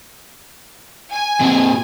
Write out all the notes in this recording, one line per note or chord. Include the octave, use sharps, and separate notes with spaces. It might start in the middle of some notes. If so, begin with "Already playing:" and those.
G#5
A#2 C4